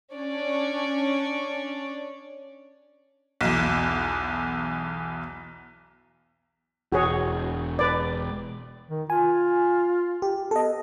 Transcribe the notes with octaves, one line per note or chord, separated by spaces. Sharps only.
C#4 D4 C#5 D5
B1 E2
E1 F#4 G#4 C#5
B4 D5
D#3
F4 G#5
G4
B3 A4 D#5